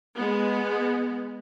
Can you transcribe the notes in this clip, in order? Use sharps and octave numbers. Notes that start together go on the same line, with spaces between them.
G#3 B3